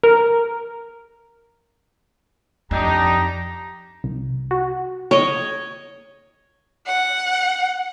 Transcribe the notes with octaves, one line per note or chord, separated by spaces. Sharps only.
A#4
F2 D4 D#4 G4 A#5
C2
F#4
C#5 D#5
F#5